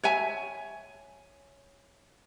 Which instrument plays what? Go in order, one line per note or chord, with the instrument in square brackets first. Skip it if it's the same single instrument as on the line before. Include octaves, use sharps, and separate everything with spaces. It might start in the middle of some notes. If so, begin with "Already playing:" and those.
[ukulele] C#5 E5 G#5